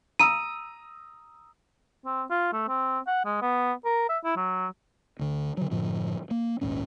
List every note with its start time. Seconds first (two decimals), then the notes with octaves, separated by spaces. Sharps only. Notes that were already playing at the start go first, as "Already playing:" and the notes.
0.19 A#5 D#6 E6 D#7
2.05 C4
2.30 F4
2.53 A3
2.68 C4
3.07 F#5
3.25 G#3
3.42 B3
3.85 A#4
4.09 E5
4.24 E4
4.36 F#3
5.19 D2 D3
5.57 D3 F#3
5.70 F#2 A2 D3 F3
6.31 A#3
6.61 A#1 D#2 G#2 C#4